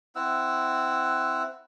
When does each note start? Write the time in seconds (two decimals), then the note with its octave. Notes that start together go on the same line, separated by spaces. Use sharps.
0.16 C4 E4 F#5 E6